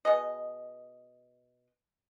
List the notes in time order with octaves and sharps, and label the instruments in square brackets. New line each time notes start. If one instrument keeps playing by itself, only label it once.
[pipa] B2 G#4 D#5